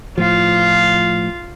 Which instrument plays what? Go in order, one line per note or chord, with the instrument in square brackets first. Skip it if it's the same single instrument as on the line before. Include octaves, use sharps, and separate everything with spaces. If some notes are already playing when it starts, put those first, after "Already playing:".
[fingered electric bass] A2 F3 [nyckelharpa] F4 F5